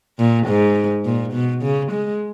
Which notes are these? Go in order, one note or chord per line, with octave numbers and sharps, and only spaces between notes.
A#2
G#2
A#2
B2
C#3
G#3